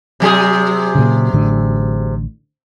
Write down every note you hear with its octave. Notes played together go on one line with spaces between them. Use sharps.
C3 F#3 G#4
A#2 C#3
A1 A2 D3